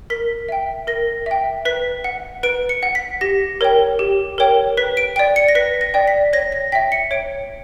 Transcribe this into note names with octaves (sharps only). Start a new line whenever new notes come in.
A#4 B6
E5 G5
A#4 A#6
E5 G5
B4 B6
F#5
B4 D7
C#7
F#5
B6
G4 A#6
A#4 C#5 G5
G4
A#4 C#5 G5
B4 B6
D7
D5 G5 D7
C#7
A#6
B4 B6
A#6
D5 G5
B6
C#5 A#6
A#6
E5 G5 B6
C#7
C#5 D7